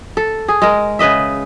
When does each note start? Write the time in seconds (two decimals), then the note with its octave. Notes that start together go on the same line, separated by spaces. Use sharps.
0.17 A4
0.48 G#4
0.62 G#3 A#4
0.99 C#3 B4 D#5 E5